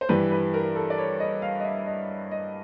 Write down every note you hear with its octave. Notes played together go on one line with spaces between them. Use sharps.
C5
G2 E3 G3 B4
B4
A#4
A4
D5
C#5
D#5
F5
D#5
E5
D#5
D#5